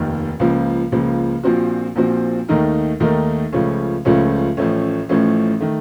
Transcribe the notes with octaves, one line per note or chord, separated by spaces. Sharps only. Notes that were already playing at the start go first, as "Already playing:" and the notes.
Already playing: F1 D#2 D#3
C#2 C#3 F3 A#3
C#2 C#3 F3 A#3
A#1 A#2 F3 C4 F#4
A#1 A#2 F3 C4 F#4
D#2 D#3 A3 D#4 A#4
D#2 D#3 A3 D#4 A#4
C#2 C#3 F3 A3 C#4
C#2 C#3 F3 A3 C#4
A1 A2 F3 A3 C#4
A1 A2 F3 A3 C#4
D#3 A3